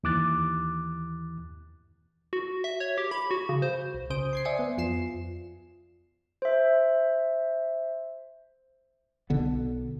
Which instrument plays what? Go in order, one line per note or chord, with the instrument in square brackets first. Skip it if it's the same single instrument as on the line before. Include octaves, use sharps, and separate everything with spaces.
[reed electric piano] D#2 E3 D6 F#6 A6
[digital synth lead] F#4
E5
C#5
G4
B5
F#4
C#3
C5
[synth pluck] B1
C2 C#3 C5 D#6 G6 D7
C6 G#6 C7
D5 E5 G#5 D#6 C#7
B3
F2 F4 C7 E7
[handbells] C5 E5
[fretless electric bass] B1 D3 B3